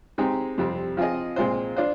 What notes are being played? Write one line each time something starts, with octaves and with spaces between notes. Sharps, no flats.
G#3 C4 D#4 G4
F2 C3 G3 C4
F3 C4 F4 G#4 D#5
A#2 G#3 C4 F4 C5
D4 F4 C5